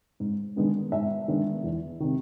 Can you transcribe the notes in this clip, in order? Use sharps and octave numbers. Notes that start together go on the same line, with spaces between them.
G#2
D#3 G#3 B3 D4
G#2 E5
D#3 G#3 B3 D4
E2
C3 D#3